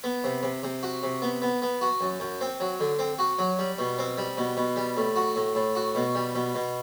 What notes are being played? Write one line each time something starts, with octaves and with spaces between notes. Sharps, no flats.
B3
C3
C3
C3
F#4
C3
B3
B3
B3
F#4
F#2
F#2
C4
F#3
D3
C4
F#4
F#3
G3
B2
C4
G3
B2
B2
G3
A2
F#4
A2
A2
F#4
B2
G3
B2
B2